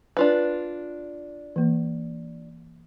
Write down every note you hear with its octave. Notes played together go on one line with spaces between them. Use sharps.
D4 F4 B4
E3 A#3